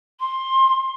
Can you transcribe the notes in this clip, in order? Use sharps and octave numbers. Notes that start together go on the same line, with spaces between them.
C6